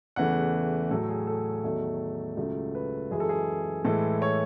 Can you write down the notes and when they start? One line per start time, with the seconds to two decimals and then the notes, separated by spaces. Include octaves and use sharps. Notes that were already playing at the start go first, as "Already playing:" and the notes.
0.16 E2 C#3 E3 A3 F#5
0.91 A2 F#3 A3 A4
1.09 G#4
1.27 A4
1.64 E2 D#3 F#3 A3
2.37 C#2 C#3 F#3 A3
2.75 B4
3.11 F#2 E3 G#3 G#4
3.20 A4
3.29 G#4
3.85 A2 E3 G#3 A4
4.22 C#5